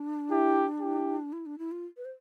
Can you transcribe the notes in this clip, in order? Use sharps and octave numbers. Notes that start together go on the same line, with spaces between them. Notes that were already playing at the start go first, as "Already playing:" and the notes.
Already playing: D4
E4 G4
E4 G4
E4
D4
E4
F4
B4
C5